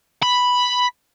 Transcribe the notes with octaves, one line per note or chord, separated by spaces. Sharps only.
B5